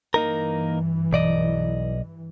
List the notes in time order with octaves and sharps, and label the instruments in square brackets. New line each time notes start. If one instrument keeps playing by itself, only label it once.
[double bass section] G2 E3 [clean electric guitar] A#3 D#4 A#4
[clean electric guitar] B1 D5 D#5